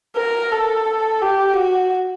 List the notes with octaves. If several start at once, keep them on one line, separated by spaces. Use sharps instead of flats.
A#4
A4
G4
F#4